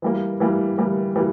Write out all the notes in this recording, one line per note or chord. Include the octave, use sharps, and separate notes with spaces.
E3 G3 A#3
E3 G3 A#3
E3 G3 A#3
E3 G3 A#3